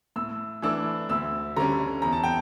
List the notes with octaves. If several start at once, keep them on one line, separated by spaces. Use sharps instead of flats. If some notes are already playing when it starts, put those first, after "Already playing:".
A2 E6
E3 A3 D4 E6
D2 E6
D3 G3 C#4 A#5
E2 A#5
A5
G5